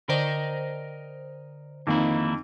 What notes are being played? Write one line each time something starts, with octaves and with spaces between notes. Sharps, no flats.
D3 A#4 C5 D5 D#5 G5
F2 D#3 A#3 D#4 E4